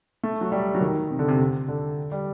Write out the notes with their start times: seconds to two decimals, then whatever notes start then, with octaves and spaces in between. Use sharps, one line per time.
0.23 A3
0.41 F#3
0.52 G3
0.74 F#3
0.81 D#3
1.11 C3
1.19 D3
1.28 C3
1.68 D3
2.12 G3